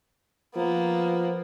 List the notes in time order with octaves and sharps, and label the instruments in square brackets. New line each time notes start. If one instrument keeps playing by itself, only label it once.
[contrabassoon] F3 [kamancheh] A#3 B3